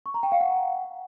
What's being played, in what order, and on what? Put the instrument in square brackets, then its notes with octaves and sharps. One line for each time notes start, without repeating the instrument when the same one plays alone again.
[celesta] C#6
A#5
G5
F5
F#5